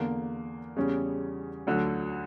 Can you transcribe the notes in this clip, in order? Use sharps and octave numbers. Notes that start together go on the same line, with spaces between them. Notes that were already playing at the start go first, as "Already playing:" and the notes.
Already playing: E2 D3 A#3
E2 C#3 G3 C#4
D2 D3 F#3